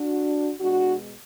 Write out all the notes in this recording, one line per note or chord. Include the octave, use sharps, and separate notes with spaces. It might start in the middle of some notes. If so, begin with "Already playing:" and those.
Already playing: D4 F#4
B2 G#3 D4 F#4